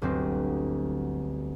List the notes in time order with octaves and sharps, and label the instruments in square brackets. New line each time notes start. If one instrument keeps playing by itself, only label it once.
[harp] G1 D2 F#3 C4